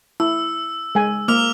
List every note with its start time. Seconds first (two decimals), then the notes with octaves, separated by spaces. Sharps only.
0.20 E4 E6
0.95 G#3 G#5
1.28 A#3 D6 F6 F7